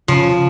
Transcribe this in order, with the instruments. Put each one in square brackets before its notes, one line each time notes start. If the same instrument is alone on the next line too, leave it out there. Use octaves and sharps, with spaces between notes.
[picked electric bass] C#3 [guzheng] F3